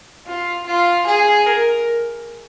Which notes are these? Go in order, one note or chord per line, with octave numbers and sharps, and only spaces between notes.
F4
F4
G#4
A#4